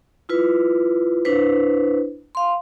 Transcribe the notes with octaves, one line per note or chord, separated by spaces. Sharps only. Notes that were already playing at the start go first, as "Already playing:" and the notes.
E4 F4 B4
D4 E4 B4 C5
F5 C6